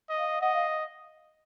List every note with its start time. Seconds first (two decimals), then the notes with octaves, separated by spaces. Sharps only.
0.10 D#5
0.17 F5
0.41 D#5 F#5
0.53 F5